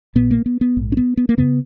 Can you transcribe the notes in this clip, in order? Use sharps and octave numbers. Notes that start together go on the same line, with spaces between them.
A#1 A#2 B3
A#3
B3
B3
A#1 G#2
C#4
B3
B3
A#3
F#2 C#3 B3